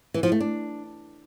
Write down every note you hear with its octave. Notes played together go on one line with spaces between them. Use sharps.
E3
F3
A3
D4